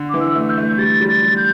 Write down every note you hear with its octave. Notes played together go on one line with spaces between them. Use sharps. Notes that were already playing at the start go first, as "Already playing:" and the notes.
Already playing: D3
E3 D6
E6
A3
G6
A3
G3 A6
G3
A6
G3
G6